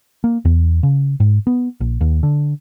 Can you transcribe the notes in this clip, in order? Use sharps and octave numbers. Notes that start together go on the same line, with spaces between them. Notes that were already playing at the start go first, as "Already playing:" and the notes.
A#3
E2
C#3
G#2
B3
A#1
D#2
D3